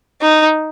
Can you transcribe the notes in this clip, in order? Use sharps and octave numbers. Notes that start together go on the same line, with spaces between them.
D#4